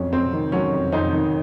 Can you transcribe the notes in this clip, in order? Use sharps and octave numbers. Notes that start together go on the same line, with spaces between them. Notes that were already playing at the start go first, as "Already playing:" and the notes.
Already playing: F2 F#3 C#4
F2 C4
D#3
F#3 C#4
F2
F2 C4 D#4
D#3